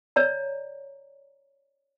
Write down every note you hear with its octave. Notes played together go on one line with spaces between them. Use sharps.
C#5 D5 A#5